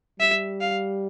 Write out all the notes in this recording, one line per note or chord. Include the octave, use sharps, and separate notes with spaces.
G3 E5
F5